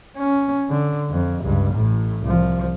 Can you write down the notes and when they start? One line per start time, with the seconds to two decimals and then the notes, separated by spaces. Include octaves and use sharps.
0.17 C#4
0.70 D3
1.11 F2
1.44 C#2 G2
1.73 A1 A2
2.22 C2 F3